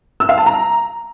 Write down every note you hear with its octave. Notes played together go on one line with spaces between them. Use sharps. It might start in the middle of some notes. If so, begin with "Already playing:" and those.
E6
F5
A5
A#5